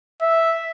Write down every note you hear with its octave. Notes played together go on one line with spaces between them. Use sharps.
E5